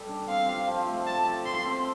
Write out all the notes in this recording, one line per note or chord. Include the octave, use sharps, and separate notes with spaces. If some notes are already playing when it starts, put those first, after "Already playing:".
Already playing: G3 A4
D4
C4 F5
F3
F3
A3
A4 A5
F3
F3 C6
C4